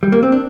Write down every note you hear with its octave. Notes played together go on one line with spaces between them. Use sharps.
G3
A#3
C4
D4